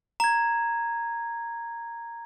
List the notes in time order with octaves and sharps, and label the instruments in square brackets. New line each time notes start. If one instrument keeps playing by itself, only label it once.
[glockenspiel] A#5 G#6